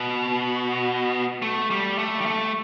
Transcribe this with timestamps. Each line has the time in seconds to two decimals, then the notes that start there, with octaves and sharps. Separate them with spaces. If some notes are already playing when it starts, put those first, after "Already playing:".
Already playing: B2
1.42 A3
1.71 G3
1.99 A3
2.21 G3
2.26 A3